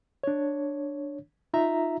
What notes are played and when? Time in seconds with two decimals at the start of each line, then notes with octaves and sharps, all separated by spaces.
0.23 D4 C#5
1.54 D#4 F4 E5 A#5